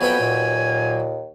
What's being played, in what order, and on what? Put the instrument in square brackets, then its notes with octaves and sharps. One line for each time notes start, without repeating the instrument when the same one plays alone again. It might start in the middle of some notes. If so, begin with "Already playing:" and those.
[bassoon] F2 [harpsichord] F#3 B4 G5 [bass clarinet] B3 [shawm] G#5
[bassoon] D#2 [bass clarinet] A#2